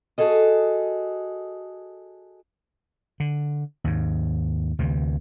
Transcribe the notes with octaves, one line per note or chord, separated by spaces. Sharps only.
F#4 G#4 A4 D#5
D3
D#2 G#2
D2 C3 E3